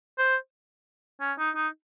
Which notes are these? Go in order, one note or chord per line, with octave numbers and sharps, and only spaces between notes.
C5
C#4
D#4
D#4